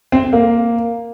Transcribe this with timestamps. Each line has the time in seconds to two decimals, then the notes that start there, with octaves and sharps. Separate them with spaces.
0.12 C4
0.33 A#3